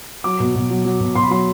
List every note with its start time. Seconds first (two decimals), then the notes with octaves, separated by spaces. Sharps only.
0.24 F#3 D6
0.40 B2
0.55 B2
0.70 F#3
0.85 F#3
1.00 B2
1.15 B2 C6
1.23 B5
1.30 F#3 C6